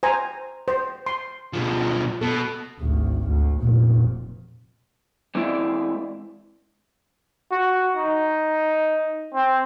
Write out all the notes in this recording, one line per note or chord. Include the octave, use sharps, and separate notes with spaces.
C5 G#5 A#5
C5
C6
B2 F3
B2 A4
G#1 D2
D2
F1 A#2
E3 G#3 C4 E4 D5
F#4
D#4
C4